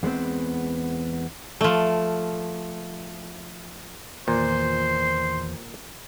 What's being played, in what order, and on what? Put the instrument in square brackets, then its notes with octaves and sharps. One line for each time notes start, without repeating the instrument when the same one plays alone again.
[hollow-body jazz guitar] E2 G#3 B3 C4
[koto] F3 A3
[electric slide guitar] E2 D#3 B4 [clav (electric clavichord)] A#2 [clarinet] C5 [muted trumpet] C6